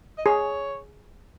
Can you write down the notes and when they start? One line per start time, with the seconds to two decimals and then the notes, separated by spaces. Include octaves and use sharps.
0.18 D#5
0.26 G#4 C#5